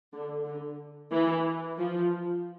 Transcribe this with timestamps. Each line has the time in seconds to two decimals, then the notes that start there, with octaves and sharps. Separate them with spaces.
0.13 D3
0.45 D3
1.12 E3
1.77 F3